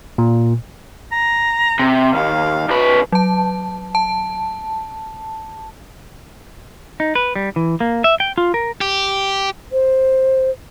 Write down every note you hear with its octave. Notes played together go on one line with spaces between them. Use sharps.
A#2
A#5
C3
D#2 F5
C2 B4
F#3 A5
A5
D#4
B4
G3
E3
A#3
E5
G5
F4
A#4
G4
C5